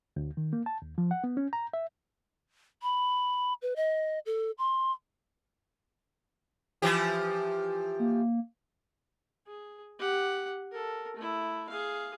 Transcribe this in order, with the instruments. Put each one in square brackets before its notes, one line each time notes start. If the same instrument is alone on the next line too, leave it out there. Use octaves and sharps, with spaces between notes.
[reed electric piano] D2
D#3
A#3
A5
D#2
F3
F#5
B3
C#4
A#5
E5
[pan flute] B5
B4
D#5
A4
C6
[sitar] E3 F3 G4
[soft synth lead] A#3
[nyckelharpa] G#4
G4 F#5
A4 A#4
A3 E4
G#4 F5